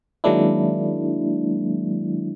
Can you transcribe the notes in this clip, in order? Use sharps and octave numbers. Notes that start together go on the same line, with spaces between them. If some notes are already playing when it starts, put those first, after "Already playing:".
D#3 F#3 G#3 A#3 D4 E4